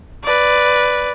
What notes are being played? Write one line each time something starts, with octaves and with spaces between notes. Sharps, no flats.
B4 D5